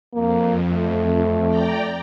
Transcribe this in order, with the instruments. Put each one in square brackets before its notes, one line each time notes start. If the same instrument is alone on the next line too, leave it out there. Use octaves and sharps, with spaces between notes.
[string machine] F2 [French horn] A#3
[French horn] A3
[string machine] D5 G5 A#5